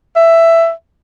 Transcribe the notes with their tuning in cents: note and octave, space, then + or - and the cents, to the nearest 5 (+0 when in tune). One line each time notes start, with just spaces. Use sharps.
E5 +10